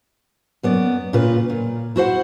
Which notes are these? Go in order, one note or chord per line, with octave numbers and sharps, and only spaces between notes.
F#2 B3 D5
A#2 C#3 F4 B4
A#2
E4 F#4 C5 F#5